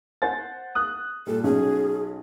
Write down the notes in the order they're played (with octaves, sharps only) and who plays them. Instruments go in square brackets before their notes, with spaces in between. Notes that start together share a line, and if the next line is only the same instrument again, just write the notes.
[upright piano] C5 F#5 A6
D#6 F#6
[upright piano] A#2 G3 [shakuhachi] A4
[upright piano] B1 C#4 [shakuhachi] G#4